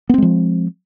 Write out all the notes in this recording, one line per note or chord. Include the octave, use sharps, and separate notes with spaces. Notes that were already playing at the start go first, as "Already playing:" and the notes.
F3 G#3 B3 C4